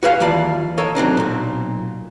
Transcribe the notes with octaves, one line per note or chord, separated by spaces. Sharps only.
F#4 G#4 B4 C#5 E5 F5
D#2 E3 F4 D5 A5
A4 A#4 C#5 D#5
F#3 C4 D4 D#4
B1 A#2